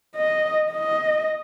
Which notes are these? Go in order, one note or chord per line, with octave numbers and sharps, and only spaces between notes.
D#5
D#5